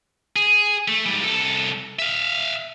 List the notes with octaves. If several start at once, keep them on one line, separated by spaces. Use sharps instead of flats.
G#4
A3
G#2 G3
C2 A4
E5 F5